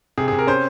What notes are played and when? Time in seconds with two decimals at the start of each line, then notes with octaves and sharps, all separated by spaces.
0.18 C3 G#4
0.28 G#4
0.33 C3
0.39 A#4
0.47 C#4 C5